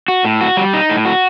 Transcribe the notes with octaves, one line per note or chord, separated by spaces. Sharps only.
F#4
A2
F#4
G3
D#4
A2
F#4